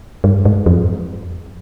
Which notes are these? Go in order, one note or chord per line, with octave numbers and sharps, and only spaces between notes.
G2
G#2
F2